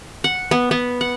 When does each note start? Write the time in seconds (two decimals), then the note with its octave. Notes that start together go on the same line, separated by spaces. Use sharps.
0.24 F#5
0.51 B3
0.71 B3
1.01 F#5